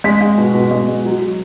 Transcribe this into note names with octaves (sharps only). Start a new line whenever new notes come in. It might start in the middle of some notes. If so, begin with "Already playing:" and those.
G#3 B6
G#3
B2
B2
G#3
G#3
F#3
F#3